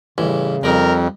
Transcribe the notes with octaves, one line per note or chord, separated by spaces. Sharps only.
A1 G2 C#3 E3
F2 G3 D#4 A#4